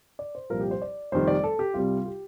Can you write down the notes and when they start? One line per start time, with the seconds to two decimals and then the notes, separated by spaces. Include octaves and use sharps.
0.19 D5
0.35 C5
0.50 C2 A#2 F3 A#4
0.61 G4
0.71 C5
0.82 D5
1.12 F1 F2 D#3 G3 C5
1.28 D5
1.44 A4
1.59 G4
1.74 C2 C3 G3 F4
2.06 G4